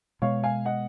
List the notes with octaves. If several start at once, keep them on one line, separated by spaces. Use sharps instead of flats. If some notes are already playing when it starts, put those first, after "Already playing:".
B2 G#3 B3 C#5 F5
F5 G#5
D#5 F#5